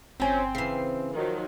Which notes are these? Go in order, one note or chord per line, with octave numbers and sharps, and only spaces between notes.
G1 F3 C4 C#4 G#5 G6
C#3 E3 C7
D#3 F3 F#3